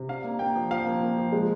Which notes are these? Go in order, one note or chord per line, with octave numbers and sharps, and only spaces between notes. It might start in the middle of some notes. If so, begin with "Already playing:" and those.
Already playing: C3
D4 F5
A#3
A#3 G5
F3
F3 F5
A#3
A#3
F3
G#3